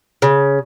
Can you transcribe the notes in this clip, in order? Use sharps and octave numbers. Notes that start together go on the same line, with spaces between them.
C#3